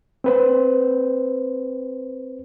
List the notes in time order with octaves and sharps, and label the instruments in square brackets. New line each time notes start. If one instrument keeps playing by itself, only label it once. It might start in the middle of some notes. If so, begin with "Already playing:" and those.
[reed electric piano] C4 B4 C5